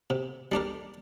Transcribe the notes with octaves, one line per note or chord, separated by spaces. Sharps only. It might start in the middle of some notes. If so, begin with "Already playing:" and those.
C3
G3 D4 G4 A#4